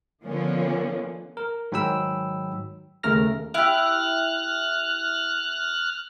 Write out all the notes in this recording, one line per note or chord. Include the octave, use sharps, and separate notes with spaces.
D3 D#3 F3 A#3 B3 C#4
A#4
G#2 D#3 F#3 G5 B5 E6
D#2 C#3 A3 A#4 F6 A#6
E4 G4 F6 F#6